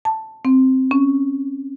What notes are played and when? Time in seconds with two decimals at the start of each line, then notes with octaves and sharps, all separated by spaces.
0.05 A5
0.45 C4
0.91 C#4